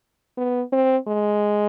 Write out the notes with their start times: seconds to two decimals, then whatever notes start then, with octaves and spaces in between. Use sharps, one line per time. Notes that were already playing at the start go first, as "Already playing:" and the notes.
0.37 B3
0.72 C4
1.08 G#3